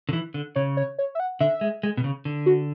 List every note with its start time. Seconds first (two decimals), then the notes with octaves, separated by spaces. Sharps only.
0.09 D3
0.13 E3
0.34 D3
0.56 C#3 C#5
0.77 C#5
0.99 C#5
1.15 E5
1.20 F#5
1.41 D3 E5
1.61 G#3
1.83 G#3
1.97 B2
2.04 C#3
2.25 D3
2.46 F#4